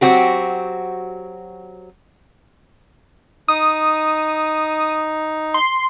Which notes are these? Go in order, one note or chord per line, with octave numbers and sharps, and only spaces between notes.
F#3 C4 F#4 G4
D#4 D#6
C6